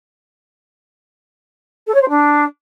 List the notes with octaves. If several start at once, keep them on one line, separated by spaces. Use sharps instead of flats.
A4
C#5
C5
D4